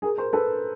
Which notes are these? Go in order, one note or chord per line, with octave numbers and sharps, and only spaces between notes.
G#4 A#4
A#4 C5
A4 B4